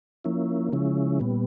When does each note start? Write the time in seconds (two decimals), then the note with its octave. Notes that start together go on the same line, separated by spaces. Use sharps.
0.24 F3 A#3 C#4 E4
0.72 C#3 F3 G#3 C#4 E4
1.20 A#2 G3 B3